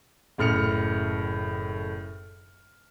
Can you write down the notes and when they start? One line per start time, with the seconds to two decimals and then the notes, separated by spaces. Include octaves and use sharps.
0.38 F#1 A2 F6 C#7 F7